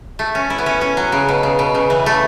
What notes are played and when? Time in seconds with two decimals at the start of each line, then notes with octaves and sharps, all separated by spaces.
0.19 A3
0.35 C#4
0.50 E4
0.58 B3
0.66 C#4
0.81 C#4
0.97 F#3
1.12 C#3
1.29 B2
1.43 C#3
1.59 B2
1.75 C#3
1.90 E3
2.06 A3